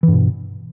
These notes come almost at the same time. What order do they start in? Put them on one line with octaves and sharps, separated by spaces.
E3 G2 B2